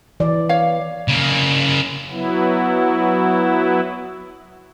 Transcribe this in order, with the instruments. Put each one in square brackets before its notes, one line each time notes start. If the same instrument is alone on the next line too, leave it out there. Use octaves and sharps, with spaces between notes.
[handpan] E3 D5
[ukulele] C#5 F5
[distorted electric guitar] C#3 A#3
[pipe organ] F#3 B3 E4